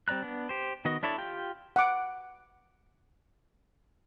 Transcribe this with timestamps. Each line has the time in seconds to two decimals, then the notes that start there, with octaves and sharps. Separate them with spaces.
0.08 G3 C4 D5 A#5 F#6
0.22 B3 D4
0.49 G4 C5
0.85 D#3 B3 F#4 D#5
1.03 D4 E4 A4 C#5 D5
1.18 F4 G4 G5
1.76 F#5 D6